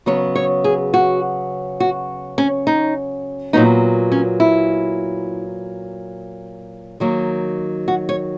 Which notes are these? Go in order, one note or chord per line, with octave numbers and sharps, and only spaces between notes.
C#3 F#3 B3 C#5
C#5
G#4
F#4
F#4
C#4
D#4
A#2 F#3 B3 D#4
C#4
E4
D#3 F#3 A#3
F#4
C#5